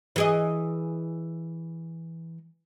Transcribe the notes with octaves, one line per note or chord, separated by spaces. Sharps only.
E3 G#4 D#5